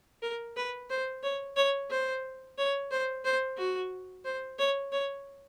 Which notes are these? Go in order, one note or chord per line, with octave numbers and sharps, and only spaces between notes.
A#4
B4
C5
C#5
C#5
C5
C#5
C5
C5
F#4
C5
C#5
C#5